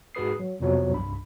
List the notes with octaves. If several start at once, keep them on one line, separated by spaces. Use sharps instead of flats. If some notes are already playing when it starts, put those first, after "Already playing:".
G#2 F#4 G#4 B4 D#6 C7
F#3
F2 C3 F3 F#3 B3
C2 G2 D4 B5